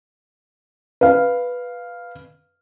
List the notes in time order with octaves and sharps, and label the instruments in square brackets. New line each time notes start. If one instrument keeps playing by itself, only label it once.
[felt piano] B4 F5